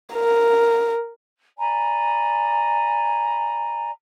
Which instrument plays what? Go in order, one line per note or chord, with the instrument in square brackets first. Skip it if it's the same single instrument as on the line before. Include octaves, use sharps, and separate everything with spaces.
[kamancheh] A#4
[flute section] D5 G#5 A#5 B5